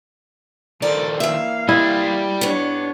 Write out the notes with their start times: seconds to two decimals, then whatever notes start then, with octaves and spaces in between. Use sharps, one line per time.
0.82 D#3 F3 A4 D5
1.20 E3 A#3 E5 F5
1.69 G3 E4 D#5
2.41 G2 B3 D4 C#5